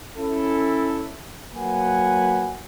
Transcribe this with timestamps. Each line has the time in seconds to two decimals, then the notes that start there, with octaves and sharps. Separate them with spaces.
0.17 C#4 E4 A4
1.54 F#3 A#3 B4 F#5 G#5